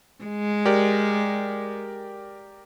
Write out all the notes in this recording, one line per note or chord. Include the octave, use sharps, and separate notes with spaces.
G#3
G4 A#4 D5